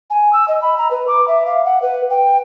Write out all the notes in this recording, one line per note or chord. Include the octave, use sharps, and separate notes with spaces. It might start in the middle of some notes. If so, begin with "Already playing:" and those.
G#5
E6
D#5
B5
A#5
B4
D6
E5
F5
F#5
B4
G5